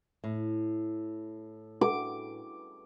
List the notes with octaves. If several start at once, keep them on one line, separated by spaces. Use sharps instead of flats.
A2
D6